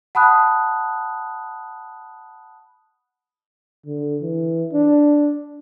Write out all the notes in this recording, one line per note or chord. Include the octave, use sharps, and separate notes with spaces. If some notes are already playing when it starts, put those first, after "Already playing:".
F#5 A5 B5 D#6 F#6
D3
E3
D4